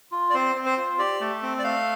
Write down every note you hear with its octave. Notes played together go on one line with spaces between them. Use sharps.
F4
D5
C4 C5
C4
C5
F4
G4 D5
A3
C4
D5
A3 F5